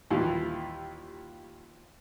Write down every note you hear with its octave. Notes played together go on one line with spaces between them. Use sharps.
D#2 A#2 E3 G3